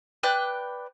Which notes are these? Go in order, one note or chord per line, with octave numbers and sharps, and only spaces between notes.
B4 D5 G5 F#6